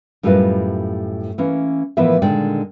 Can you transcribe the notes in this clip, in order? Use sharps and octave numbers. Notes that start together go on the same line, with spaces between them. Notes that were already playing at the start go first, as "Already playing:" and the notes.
F#2 A2 G3 F4 A#4 B4
E3 A#3 C#4
A2 E3 F3 B3 A#4 E5
A#2 D3 D#3 G#3 D5 G5